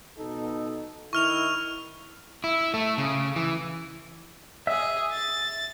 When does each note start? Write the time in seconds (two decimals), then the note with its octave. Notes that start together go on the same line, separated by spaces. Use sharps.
0.19 B2 D#4 A4
1.13 D#3 E4 C#6 F6 F7
2.44 E4
2.74 A3
2.98 C#3
3.36 E3
4.67 G#4 E5
5.13 A6